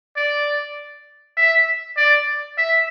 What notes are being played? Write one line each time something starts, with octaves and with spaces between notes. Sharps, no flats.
D5
E5
D5
E5